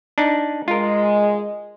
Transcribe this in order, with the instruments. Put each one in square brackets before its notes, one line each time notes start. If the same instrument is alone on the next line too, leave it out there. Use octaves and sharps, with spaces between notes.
[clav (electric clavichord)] D4 D#4
[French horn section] G#3 [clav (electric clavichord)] F4 A#4